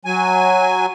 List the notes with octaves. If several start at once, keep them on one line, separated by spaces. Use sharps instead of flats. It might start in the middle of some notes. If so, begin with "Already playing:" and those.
F#3 G#5